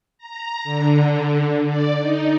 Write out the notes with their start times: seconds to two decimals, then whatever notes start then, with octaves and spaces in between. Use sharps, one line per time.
0.18 A#5
0.64 D3
1.66 D5
1.97 D#4